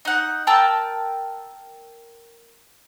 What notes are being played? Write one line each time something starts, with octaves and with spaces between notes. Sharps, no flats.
D#4 F#5
A#4 G5 A5 E6